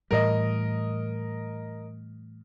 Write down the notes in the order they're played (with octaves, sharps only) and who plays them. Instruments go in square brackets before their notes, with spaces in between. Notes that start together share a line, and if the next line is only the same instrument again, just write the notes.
[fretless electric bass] A2 E3 G3 [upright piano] A#4 D#5